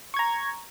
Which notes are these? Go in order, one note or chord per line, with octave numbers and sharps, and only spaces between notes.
A#5 C#6 G#6